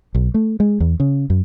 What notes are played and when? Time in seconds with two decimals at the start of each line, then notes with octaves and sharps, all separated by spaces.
0.15 B1
0.34 A3
0.60 G#3
0.80 E2
1.00 C#3
1.30 F#2